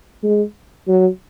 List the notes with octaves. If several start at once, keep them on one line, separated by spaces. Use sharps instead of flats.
G#3
F#3